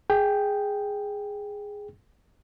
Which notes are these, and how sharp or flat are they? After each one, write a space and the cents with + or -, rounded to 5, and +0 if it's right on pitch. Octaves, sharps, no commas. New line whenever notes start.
G#4 -5 G5 +0